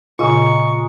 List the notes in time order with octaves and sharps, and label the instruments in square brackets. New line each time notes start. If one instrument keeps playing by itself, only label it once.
[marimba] A#2 C#3 [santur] G#3 A#4 [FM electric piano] F4 [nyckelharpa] C#6